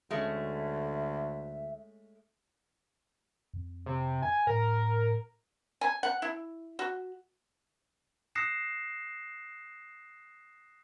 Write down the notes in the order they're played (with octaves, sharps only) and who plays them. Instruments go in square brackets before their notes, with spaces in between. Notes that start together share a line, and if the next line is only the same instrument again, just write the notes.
[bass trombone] D2 [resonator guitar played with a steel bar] G#3 A3 C#4 [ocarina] E5
[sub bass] F2
[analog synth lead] C3
G#5
[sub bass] A2 [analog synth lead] A#4
[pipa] G#5
F#5
E4
F#4
[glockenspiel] D#6 F#6 A#6 C7 C#7 E7